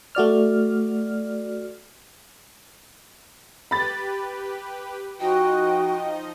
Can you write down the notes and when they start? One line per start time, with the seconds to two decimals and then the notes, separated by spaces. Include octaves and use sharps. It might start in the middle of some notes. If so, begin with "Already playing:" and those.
0.15 A3 F#4 D5 F6
3.71 G4 B4 B5 A6
5.20 F3 D#4 F#4 D#5 G5